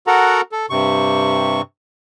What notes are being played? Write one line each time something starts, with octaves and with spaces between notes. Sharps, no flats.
F#4 A4 A#4 F#5 A#5
A4
G2 C3 C#6